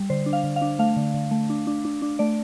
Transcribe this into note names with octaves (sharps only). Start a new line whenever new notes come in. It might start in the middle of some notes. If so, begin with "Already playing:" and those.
Already playing: G3
D3 C5
D4
F5
D3
F5
D4
A3 F5
D3
D3
A3
D4
D4
D4
D4
A3 D5